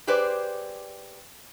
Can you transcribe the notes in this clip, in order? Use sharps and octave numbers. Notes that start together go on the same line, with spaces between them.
G4 G#4 B4 C5 D5